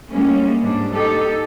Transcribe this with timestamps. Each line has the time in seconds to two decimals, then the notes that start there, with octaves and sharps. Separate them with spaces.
0.11 D2 G3 G#3 A#3 C#4
0.61 G#2 G3 D4
0.92 D#4 G4 A4